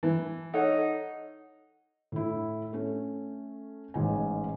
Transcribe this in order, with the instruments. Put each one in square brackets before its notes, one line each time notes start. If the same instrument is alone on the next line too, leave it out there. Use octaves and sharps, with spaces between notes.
[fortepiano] E3
[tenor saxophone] D#4 [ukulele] A4 C#5 F#5
[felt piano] A2 E4
A3 C#4
A1 G#2 G#5